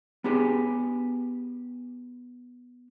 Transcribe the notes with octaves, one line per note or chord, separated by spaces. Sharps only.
B3 D4 G4 G#4